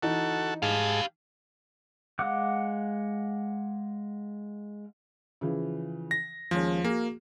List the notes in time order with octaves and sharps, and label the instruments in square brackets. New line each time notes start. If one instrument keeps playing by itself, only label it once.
[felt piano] E3 D#4 [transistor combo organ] F#4 A4
[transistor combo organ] G#2 G#4 A5 [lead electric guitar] G4 F5
[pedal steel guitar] G#3 F5 F#5 D6 F#6
[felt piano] C#3 E3 F3
[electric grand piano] A#6
[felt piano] D#2 G#3 C#4 [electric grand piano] F3
[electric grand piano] A#3 [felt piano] F#4 G#4